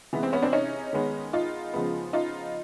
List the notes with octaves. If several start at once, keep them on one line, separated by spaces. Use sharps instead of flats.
C3 E3 G#3 B3
C4
B3 C#4
C4 D4
C#4 D#4
D#3 G#3 B3
D#4 F4
C#3 F3 G#3 B3
D#4 F4